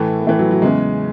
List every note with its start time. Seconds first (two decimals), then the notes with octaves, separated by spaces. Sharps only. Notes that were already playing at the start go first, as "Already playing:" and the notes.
Already playing: A2 E3 A3
0.20 B3
0.27 A2 E3 A3
0.39 F#3
0.51 F#3
0.62 E2 C#3 E3 G#3